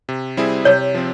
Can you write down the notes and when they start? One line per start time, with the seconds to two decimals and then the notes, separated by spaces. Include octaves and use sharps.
0.09 C3
0.37 G3 C4 E4 G#4
0.65 C3 C#5
0.94 F3 C4